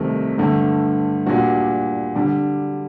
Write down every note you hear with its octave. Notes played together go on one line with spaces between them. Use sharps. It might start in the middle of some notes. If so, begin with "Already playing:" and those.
Already playing: C2 C3 D#3 A3
G2 D3 A3
A#2 G3 D4 F#4
D3 G3 D4